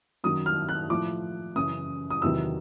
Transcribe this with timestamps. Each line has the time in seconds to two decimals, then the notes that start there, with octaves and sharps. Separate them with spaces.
0.24 F#2 D#3 F#3 D#6
0.46 F6
0.69 F#6
0.90 A2 F3 D6
1.56 F#2 C#3 E3 D#6
2.10 D#6
2.22 E2 C3 D#3 F#3 E6